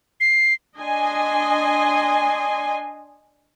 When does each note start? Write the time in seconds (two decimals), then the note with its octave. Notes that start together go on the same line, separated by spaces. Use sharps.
0.20 C7
0.77 D4 D#5 G#5 C6